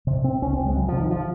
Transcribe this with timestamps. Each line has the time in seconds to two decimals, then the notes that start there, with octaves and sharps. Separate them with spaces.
0.07 C3
0.24 C3 C4
0.42 C#2 C#4
0.53 C4
0.59 C#2
0.66 G#3
0.76 C3 F#3
0.88 F3
0.93 C3
1.00 D#3
1.11 F3